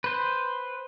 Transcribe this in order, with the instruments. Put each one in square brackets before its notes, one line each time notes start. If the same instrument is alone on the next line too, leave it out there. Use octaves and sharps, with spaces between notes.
[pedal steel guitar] B4 C5